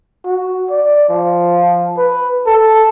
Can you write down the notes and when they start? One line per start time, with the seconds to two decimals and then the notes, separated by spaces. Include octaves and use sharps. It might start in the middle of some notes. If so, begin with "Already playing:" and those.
0.25 F#4
0.70 D5
1.09 F3
1.97 B4
2.46 A4